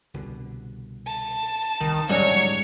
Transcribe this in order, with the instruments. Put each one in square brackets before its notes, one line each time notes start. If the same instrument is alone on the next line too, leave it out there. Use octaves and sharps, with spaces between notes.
[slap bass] C2 B2 D3
[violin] A5
[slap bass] C2 [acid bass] D#3
[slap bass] D1 F2 [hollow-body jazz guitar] G#2 G3 C#4 [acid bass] F#3 [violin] C#5